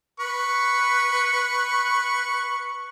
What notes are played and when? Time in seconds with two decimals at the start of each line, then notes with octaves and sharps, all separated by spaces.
0.20 B4 C#6